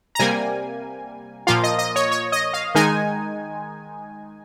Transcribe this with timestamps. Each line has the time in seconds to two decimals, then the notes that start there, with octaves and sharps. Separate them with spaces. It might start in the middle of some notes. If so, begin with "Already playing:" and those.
0.15 A#5
0.19 C3 G3 A#3 G#5
1.47 A#2 F3 A#3 F4 F5
1.64 D#5
1.79 D#5
1.96 C#5
2.12 C#5
2.32 D#5
2.54 F5
2.75 D#3 G#3 D#4 G#5